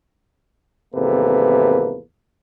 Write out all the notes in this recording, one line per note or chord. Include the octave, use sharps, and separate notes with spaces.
G#1 E2 C3 A#3 A4 B4